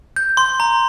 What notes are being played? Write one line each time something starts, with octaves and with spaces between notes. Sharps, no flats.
G6
C6
A#5